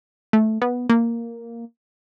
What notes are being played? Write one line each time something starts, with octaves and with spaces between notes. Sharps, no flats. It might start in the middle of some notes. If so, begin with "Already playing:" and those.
A3
B3
A#3